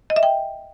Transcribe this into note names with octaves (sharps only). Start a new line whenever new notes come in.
D#5
E5
G5